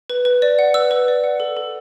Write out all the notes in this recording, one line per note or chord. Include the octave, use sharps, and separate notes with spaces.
B4
B4
D5
F#5
B4 E6
B4
D5
F#5
A4
A4